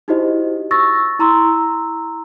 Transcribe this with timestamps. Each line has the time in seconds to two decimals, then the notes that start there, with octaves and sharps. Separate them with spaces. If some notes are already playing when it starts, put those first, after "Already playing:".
0.08 D#4 E4 F#4 G4 C5 D#5
0.71 C#6 E6 A6 A#6
1.19 E4 A#5 C6 E6